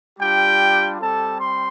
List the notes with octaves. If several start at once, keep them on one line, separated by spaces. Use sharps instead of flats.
G3 D4 F4 G4 G5
G3 C4 G4 A4 A5
C6